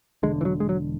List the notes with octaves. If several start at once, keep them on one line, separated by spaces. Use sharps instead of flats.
E1 E2 D3 G#3
E3
F#3
G#3
F#3